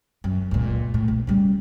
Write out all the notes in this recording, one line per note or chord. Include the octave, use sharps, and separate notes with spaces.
F#2
C#2 A#2
A2
A#1
C#3 G3